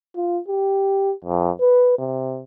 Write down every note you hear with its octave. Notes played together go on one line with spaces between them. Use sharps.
F4
G4
F2
B4
C3